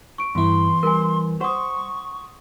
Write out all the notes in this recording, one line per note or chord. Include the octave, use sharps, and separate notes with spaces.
C#6 D7
E2 G2 E4 C6
G3 A#4 G#5
C5 F#5 C6 C#6 D#6